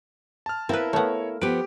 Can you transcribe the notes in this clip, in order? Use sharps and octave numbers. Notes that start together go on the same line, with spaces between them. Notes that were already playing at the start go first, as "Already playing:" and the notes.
A5 F6
A#3 C4 E4 B4
A3 B3 C#5
F3 B3 G4 B4 D7